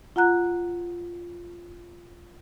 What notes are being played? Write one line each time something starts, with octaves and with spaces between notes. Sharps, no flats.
F4 F#5 A#5 F#6